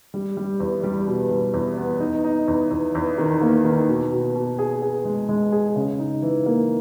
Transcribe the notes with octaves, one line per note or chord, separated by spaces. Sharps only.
G3
G3
E2
G3
B2
G3
E2
B3
D#4
D#4
E2
E2
E2
D#3
A#3
D#3
B2
B2
B2
G#4
G#4
G#3
G#3
G#4
C#3
D#4
E3
A#3